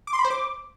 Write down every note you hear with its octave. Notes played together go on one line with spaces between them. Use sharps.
D6
C6
B5
C5
D6